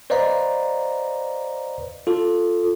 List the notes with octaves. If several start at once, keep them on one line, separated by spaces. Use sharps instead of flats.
B4 C5 D5 D#5 F5 A#5
F4 A4